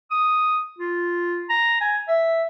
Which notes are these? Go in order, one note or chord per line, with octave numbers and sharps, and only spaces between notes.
D#6
F4
A#5
G#5
E5